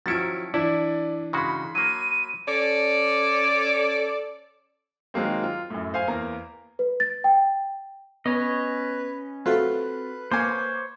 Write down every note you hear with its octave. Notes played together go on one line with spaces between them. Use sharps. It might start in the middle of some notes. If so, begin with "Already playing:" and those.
D#3 F3 F#3 C#4 E4 A6 C#7 D7
E3 D4 E4 D5
C#3 G#3 F#4 B5 C6
F#3 A#3 D#7
C#4 A4 D5
D#3 F#3 G#3 A#3 C4
F4
F#2 A2
C5 F5 G#5
E2 A#3 A#5
B4
A6
G5
B3 C#4 B4 C#5 D#5
F#3 A3 C4 F4 F#4 A4 B4
A#3 A#4 C5 C#5 G#5 A#5 D6